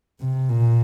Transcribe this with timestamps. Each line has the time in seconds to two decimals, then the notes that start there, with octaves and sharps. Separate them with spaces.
0.20 C3
0.49 A#2